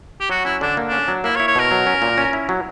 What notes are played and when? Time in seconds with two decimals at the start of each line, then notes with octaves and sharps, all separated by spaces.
0.21 G4
0.29 F#3 F#4
0.45 C#4 E4
0.61 D3 D4
0.77 A#3
0.88 C#4 D4
1.08 F#3
1.24 A#3 E4
1.36 C#5
1.40 E4
1.48 C#5
1.55 B2 A#4
1.71 F#3
1.87 C#4
2.02 A#2
2.18 C#4
2.33 E4
2.49 F#3